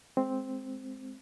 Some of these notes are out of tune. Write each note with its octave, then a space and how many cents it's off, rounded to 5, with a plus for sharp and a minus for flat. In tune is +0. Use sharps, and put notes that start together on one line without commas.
G#3 +15 C4 +0